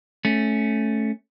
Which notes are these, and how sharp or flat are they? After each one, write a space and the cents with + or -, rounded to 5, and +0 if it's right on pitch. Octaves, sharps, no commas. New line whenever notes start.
A3 -10 C#4 +0